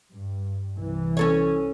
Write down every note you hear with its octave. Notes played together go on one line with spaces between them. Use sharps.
G2
C2 E3
C#4 A4 C#5